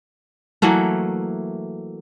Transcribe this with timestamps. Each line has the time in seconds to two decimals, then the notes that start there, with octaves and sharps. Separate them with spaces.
0.62 E3 F#3 A3 A#3